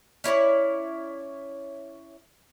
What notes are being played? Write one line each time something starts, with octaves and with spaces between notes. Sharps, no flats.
C#4 E4 C#5 D5